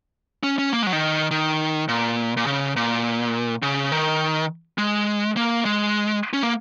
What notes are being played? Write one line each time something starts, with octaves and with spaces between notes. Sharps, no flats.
C#4
C#4
A#3
G#3
F#3
D#3
D#3
A#2
A#2
C#3
A#2
C#3
D#3
G#3
A#3
G#3
C#4
A#3